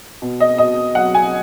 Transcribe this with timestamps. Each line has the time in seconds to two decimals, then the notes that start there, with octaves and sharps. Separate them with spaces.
0.22 B2
0.40 D#5
0.58 B2 D#5
0.95 F#3 F#5
1.14 G#5